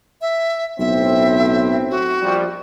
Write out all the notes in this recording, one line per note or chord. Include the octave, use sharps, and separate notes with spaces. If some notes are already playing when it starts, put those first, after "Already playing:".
E5
B1 A2 C4 E5
F#4
A#1 F3 G3